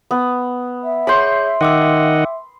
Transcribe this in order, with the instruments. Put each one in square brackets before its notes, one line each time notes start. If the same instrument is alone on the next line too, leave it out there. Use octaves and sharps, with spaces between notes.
[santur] B3
[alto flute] E5
[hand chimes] G#4 C#5 G6 [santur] B5 C6
[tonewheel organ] D#3 D#5 F#5 [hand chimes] G5 D6 E6